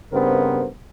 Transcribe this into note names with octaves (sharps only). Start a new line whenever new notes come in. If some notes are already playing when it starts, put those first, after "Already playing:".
G2 C#3 B3 C4 A#4 C5